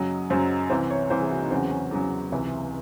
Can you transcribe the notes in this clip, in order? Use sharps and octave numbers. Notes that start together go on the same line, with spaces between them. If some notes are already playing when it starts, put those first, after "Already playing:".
Already playing: F#2 C#3 F#3 D#5
F#2 C#3 F#3 C5
C2 C3 E3 C5
C#5
C2 C3 E3 C5
G#4
F#4
D#4
E2 C#3 F#3 C4
C#4
E2 C#3 F#3
C#2 C3 E3